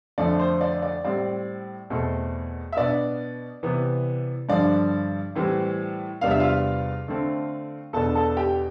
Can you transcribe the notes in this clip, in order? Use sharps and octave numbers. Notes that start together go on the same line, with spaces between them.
F2 D3 F3 A3 D5
C5
D5
D5
A2 G3 C4 D5
E2 B2 A3 C4
E5
B2 B3 D4 D5
C3 E3 B3
G2 D3 F3 D5
A2 E3 G3 C4
E2 C3 G3 B3 D4 F5
E5
F4 F5
D3 A3 C4
E2 B2 B3 D4 A4 A5
A4 A5
G4 G5